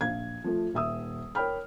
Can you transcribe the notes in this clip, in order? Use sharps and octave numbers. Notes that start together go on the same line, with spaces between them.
A#1 F5 G#6
F3 A3
D#1 E5 D#6 E6
A#4 C#5 G5 B5 F6